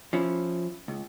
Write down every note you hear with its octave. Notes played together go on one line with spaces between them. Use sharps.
F3 C#4 E4
C#2